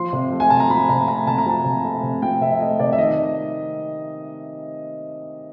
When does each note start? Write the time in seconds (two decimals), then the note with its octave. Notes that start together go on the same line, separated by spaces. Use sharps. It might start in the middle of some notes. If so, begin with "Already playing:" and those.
Already playing: F3 C6
0.13 C3
0.32 A3
0.40 G#5
0.50 C3 A5
0.60 A#5
0.70 F3 B5
0.89 C3 A#5
1.08 A3 A#5
1.27 C3 A5
1.38 A#5
1.46 F3 A5
1.65 C3
1.84 A3
2.03 C3
2.22 F3 G5
2.41 C3 E5
2.60 A3 D#5
2.80 C3 D5
2.92 E5
2.98 D#3 D#5